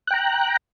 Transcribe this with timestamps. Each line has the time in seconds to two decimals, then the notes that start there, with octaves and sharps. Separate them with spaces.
0.07 F#6
0.11 G5
0.14 A#5